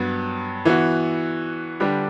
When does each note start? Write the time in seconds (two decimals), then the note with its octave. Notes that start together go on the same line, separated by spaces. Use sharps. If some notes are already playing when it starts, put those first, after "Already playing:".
Already playing: G2 F#3 B3
0.65 E3 B3 F#4
1.80 D3 G3 D4 G4 B4